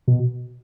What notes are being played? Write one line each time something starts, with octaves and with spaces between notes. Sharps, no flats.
B2